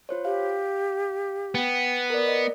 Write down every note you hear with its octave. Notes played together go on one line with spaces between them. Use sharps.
F4 C5 C#5
G4 F5
B3 G5
A#4 D5
D#5